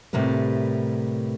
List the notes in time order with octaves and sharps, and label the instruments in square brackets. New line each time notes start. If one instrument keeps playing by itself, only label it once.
[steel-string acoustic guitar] A2 C3 G3 A#4 B4